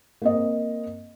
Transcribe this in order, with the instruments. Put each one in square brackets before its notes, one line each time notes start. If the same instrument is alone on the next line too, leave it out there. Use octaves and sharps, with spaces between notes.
[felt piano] A#3 C4 D#5